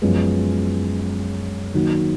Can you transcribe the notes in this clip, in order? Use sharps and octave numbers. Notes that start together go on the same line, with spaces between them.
F#2 F3 G#3 B3
D#3 F#3 A#3 D#4 F#4